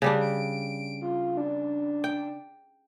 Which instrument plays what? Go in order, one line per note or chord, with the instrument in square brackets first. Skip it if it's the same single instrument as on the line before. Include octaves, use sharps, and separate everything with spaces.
[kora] C#3 G3 D4
[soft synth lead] D7
F4
D4
[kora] G5